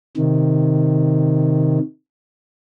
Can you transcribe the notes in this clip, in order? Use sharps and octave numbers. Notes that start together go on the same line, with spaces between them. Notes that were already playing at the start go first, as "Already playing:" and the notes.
C3 D#3